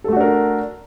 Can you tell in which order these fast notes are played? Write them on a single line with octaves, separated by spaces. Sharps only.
A4 A3 F#4 D4 A#4